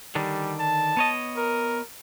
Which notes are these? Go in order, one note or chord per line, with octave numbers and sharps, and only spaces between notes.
D3 D#3 G3 D4
A5
B3 C#5 D#5
A#4